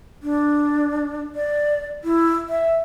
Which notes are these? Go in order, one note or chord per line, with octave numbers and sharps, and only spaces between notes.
D4
D5
E4
E5